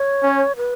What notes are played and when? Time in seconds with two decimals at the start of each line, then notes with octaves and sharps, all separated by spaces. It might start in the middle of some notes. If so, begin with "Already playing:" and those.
Already playing: C#5
0.23 C#4
0.57 B4